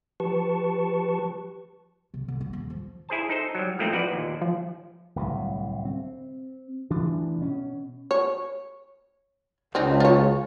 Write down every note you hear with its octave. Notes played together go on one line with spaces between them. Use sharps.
F3 G4 B4 A5 C#6
C3
D3
F4
D#1
F3
E4 G#4 C5 A5
D#4 A4 C5
F#3 G3
F3 A3 A#3 C4 D#4
F3 F#4 B4 D5
D#2 A#2
F3
D1 C2 C3
C4
D2 E3 D4
B2 C#4
C#5
C#2 C4 D#4
F4 C#5